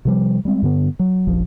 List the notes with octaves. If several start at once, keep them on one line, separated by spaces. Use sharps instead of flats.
C3 F3 G3
G3 G#3 C4
G2 D3 B3
F#3
F1 A#1 F3